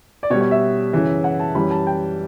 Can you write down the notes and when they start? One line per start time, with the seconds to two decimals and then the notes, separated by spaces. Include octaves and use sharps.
0.23 D5
0.30 B2 C#5
0.33 G3
0.41 C#5
0.51 E5
0.93 F#2 C#3 E3
1.24 F#5
1.40 A5
1.55 F#2 E3 G3 B5
1.71 A5
1.87 G5